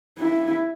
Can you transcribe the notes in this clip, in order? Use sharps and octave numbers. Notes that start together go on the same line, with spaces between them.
E4